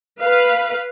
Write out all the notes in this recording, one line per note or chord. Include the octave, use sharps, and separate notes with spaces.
B4 F5